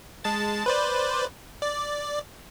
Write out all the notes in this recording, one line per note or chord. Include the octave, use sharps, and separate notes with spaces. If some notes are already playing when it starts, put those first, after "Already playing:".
G#3 A5 A6
B4 C5 D5
D5